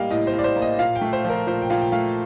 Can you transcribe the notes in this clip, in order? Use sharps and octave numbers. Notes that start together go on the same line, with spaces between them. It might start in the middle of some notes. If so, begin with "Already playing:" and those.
Already playing: A2 G3 A#3 D#5 F5 G5
A2 D#5
C5
A2
D5
C5
A#3
D#5
A#2 F5
G5
A3
C5
F3
A#4
A#2 C5
G5
A#2 F5
G5
A3 F5